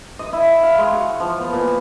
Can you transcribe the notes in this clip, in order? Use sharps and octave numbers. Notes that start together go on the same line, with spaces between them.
D#5
E4
F5
G#3
F#4
F3
B3
A#2